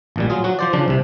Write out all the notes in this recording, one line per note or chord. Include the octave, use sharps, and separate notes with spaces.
A1 A#2 G3
F#3 F4 G#4
F#3 F#4
F3 C5 D5
C#3 F3 D4
C2 C3